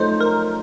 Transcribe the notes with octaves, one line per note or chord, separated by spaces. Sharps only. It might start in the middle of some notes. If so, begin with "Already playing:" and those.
Already playing: F#2 F3 A3 D#4 A4 C5
A#4